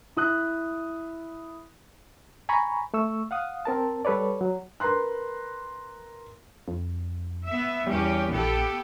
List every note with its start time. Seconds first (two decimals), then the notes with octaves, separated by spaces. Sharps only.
0.16 E4 D#6 F#6
2.49 G#5 A#5 B5 C#6
2.94 A3 C#6 E6
3.31 F5 F#5 D#6
3.65 C4 A#4 A5
4.05 G3 A4 B4 C#5 D5
4.41 F#3
4.80 A#4 B4 A#5 C6 F#6
6.68 F2
7.45 B3 E5
7.87 E2 G3 C#4 G4
8.30 A#1 B3 G4 A4